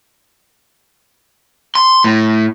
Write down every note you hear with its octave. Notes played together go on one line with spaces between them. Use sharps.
C6
A2